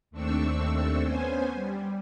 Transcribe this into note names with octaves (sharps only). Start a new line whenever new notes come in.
D#2 A3 C4 D4 C#6 E6
B3 C#4 C5 G#5
G3